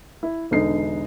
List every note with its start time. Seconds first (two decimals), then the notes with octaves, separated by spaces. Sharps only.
0.23 E4
0.51 E1 D3 D#4 C7